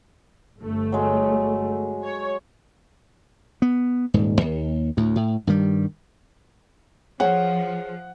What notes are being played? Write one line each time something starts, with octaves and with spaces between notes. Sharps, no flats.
G1 A3
F#3 G#3
C#5
B3
D#1 G#2
D#2
D2 A2
A2
G2 D#3 G3
F3 G#4 C5 C#5 F#5